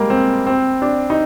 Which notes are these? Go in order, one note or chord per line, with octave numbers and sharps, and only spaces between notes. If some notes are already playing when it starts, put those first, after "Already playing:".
Already playing: G3 G#3 A#3
C4
C4
D4
D#4